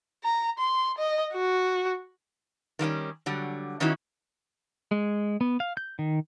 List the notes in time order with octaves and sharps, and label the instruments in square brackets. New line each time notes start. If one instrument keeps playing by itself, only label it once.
[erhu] A#5
C6
D#5
F#4
[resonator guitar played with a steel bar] D#3 G3 A#3 C#4
D3 F#3 G3
D#3 C#4 D#4 E4 F#4
[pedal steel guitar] G#3
B3
F5
G6
D#3